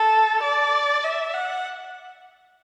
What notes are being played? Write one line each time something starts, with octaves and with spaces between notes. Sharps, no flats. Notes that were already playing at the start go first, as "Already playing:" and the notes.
Already playing: A4
D5
E5
F#5